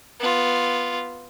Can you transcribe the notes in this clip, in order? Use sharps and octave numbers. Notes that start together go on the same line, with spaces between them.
B3 F4